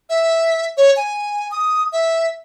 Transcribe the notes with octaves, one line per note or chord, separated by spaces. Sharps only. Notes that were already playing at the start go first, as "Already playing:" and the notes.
E5
C#5
G#5
D#6
E5